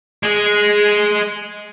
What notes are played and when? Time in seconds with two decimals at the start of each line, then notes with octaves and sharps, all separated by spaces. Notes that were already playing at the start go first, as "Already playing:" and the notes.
0.23 G#3 G#4